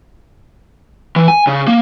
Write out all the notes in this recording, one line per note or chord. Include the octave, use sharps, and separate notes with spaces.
E3
G#5
C#3
A#3